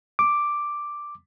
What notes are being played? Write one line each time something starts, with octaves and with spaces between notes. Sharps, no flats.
D6